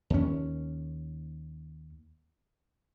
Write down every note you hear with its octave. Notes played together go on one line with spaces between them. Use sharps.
D#2 C#4